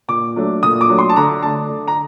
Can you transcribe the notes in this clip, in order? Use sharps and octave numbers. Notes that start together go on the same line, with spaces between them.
A#2 D6
F#3 A3 D4
A#2 D#6
D6
F#3 A3 D4
C6
A5
D3 A#5
A3 D4 A5
D3
A#5